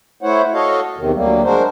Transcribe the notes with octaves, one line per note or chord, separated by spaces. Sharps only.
A3 E4 C5 C#5 F#5
F#4 A4 C#5 D#5 F5
E2 C3 D#3
D2 F#3 G3 A#3
G#3 D4 F#4 A#4 C5